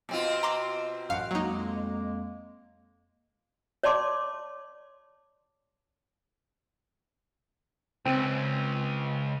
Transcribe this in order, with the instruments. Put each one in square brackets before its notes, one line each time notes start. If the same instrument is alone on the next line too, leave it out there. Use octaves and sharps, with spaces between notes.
[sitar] B2 C4 F4
[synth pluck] A#5 C6 D6
[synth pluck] A1 F#2 F5 [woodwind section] F#5
[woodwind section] F2 G#3 A#3 [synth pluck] F#3 D#4
[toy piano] C#5 D5 A5 C6 D6
[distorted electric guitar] C#2 [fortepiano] C4